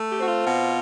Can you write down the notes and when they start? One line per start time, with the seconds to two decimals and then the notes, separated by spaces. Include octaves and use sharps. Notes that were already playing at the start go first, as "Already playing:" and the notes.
Already playing: A3
0.09 G4
0.17 C4 F#4
0.27 F4
0.45 B2